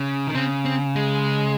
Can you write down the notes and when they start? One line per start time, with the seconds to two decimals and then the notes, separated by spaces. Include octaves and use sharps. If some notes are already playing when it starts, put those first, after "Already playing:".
Already playing: C#3
0.27 D#3
0.35 C#3 C4
0.65 C4
0.96 G#3